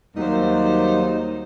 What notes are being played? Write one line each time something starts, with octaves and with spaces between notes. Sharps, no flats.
D#2 F#3 G3 A#3 D#4 C5